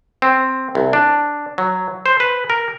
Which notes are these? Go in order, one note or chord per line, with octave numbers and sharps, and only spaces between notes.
C4
C2
D4
F#3
C5
B4
A#4